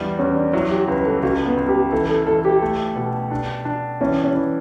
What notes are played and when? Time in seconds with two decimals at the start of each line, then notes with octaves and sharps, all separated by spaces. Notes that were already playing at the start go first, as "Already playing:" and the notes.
Already playing: E2 G3 D4 E4
0.19 E2 C#4
0.36 D4
0.53 F#3 E4
0.71 G4
0.88 C#2 B4
1.05 A4
1.23 C#2 F#4
1.46 B3
1.57 C#2
1.68 G4
1.92 E3 A4
2.09 A4
2.27 E3 A4
2.45 G4
2.62 A3
2.96 B2
3.31 D4
3.65 D4
4.01 E3 C#4
4.24 C#4
4.35 E3